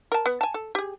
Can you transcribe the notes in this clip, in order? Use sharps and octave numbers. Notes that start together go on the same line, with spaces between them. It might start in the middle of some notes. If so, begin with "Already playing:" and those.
A#4 A5
B3
G#5 A5
A4
G4 G#4